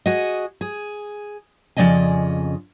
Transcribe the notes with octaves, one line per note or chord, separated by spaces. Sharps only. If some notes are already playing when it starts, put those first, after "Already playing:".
F#4 G#4 D#5
G#4
F2 C#3 G#3 D5 D#5 G#5